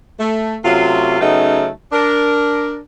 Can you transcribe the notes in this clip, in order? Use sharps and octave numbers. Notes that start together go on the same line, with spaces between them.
A3
C3 F#3 A3 C#4 F4
C#3 F#3 A3 B3 C#4 D#4
D4 A#4